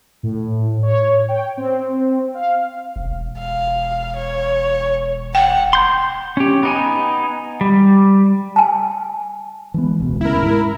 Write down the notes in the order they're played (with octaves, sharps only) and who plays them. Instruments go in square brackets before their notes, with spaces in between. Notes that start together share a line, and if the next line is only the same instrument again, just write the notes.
[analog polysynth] A2
C#5
G5
C4
F5
[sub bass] E1
[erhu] F5
C#5
[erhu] F#5 [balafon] G5
[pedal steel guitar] C6 G6
C#4 G4
B3 D#4 G#5
G3
[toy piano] G#5 A5
[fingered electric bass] E3 G#3 B3
E1 C#2 B2
[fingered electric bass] D2 C#3 [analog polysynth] E4 A#4
[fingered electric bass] G#2